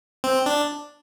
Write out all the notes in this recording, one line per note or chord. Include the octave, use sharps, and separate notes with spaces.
C4
D4